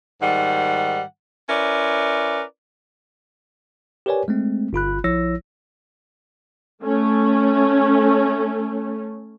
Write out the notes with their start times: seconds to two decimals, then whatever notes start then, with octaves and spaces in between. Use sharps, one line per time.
0.22 G#2 D#3 G3 F#5
1.49 C#4 E4 A#4 B4 D5
4.06 G4 A#4 B4 C#5 D5 G#5
4.28 G#3 A3 C4
4.73 G1 F4 B5 F#6
5.04 A#1 F3 E4 C#5 E6 A#6
6.82 A3 C#4